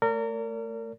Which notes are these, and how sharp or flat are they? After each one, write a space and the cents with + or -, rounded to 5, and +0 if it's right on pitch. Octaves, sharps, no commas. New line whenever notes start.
A3 +5 A#4 -30 D5 -40